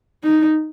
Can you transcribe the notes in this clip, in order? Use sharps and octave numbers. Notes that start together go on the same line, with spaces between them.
D#4